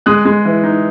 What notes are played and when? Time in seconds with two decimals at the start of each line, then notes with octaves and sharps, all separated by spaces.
0.06 G#3 D#6 F#6
0.25 G#3
0.45 E3
0.64 D#4